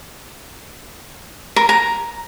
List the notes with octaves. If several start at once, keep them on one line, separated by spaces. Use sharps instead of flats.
A#4
A#5